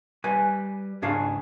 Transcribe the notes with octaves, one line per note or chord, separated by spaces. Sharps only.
G3 B4 G#5
C#2 G#2 D4 G#4 F5